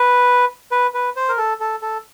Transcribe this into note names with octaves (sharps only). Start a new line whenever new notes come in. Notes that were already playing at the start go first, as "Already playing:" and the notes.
Already playing: B4
B4
B4
C5
A#4
A4
A4
A4